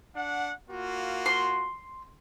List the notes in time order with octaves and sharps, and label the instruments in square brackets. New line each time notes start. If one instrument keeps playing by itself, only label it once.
[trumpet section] D4 F#5
A#3 F4 F#4
[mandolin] C6